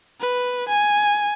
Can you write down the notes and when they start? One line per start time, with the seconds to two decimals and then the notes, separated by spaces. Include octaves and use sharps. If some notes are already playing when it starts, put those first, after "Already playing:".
0.20 B4
0.68 G#5